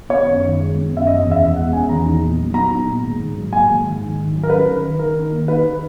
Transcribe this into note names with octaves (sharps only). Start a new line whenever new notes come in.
B3 C#5
F#2
D#3
G#3
B3
F#2
E5
C#4 D#5
E2
E5
B2
G#3 F#5
C#4 G#5
E2 A#5
D#4
A#2
F#3
B3 A#5
D#4
A#2
G#2
G#2
F#3
A#3 G#5
G#2
G#2
D#3
D#3
F#3
A#4
C#4 B4
D#3
D#3
D#3 A#4
D#3
A#3
D#4 B4
D#3